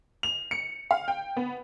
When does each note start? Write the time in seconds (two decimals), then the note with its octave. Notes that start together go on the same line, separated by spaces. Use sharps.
0.23 F7
0.51 C#7
0.91 F5
1.08 G5
1.37 B3